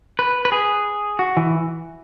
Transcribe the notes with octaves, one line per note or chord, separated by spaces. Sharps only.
B4
B4
G#4
F#4
E3